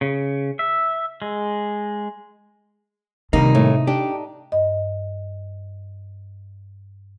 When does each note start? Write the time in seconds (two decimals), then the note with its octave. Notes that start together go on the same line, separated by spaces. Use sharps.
0.01 C#3
0.59 E5
1.22 G#3
3.33 C3 D#3 G3 A#3 D#4
3.55 A2
3.87 D4 G4
4.52 G2 D#5